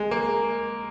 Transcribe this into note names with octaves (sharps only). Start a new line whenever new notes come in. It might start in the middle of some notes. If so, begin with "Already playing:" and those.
Already playing: G#3
A#3